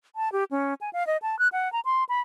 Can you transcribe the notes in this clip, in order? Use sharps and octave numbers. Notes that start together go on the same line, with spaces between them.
A5
G4
C#4
G#5
F5
D#5
A5
F#6
F#5
A#5
C6
B5